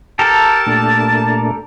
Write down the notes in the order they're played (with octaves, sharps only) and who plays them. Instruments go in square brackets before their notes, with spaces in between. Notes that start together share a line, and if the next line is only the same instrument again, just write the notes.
[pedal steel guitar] G4 A4 A#4 [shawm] A5
[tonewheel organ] A#2 A3 D4